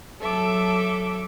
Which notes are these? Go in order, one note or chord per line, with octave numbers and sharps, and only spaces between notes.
F#3 A4 E5 D6